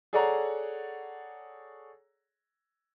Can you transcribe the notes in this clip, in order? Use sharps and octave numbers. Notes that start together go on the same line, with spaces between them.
G#4 A4 C#5 D5 F#5 A#5